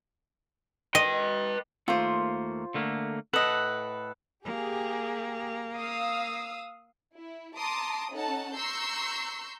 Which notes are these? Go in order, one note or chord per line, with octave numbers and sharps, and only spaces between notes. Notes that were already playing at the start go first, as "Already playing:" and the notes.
B4 D#5 G5
D#2 A3 A#3 F4 C5
D3 A3 A#3
A2 A4 B4 D#5 F#5
A#3 G4 G#4
F5 D#6 E6
E4
A5 A#5 C6 D6 D#6
C#4 D#4 A4 F#5 A5
A#5 C6 C#6 E6 G6 C7